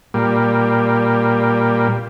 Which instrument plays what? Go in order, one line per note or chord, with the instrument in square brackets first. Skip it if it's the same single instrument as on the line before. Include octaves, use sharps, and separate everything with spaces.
[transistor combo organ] A#2 G3